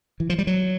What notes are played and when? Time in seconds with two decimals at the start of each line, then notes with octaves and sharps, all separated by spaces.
0.20 E3
0.30 F3
0.38 G3
0.47 F#3